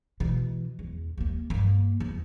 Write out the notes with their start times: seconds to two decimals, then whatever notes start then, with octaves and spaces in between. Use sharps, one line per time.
0.20 B2 E3
0.79 E2
1.18 D#2 A#3
1.50 G2 A#3
2.00 E2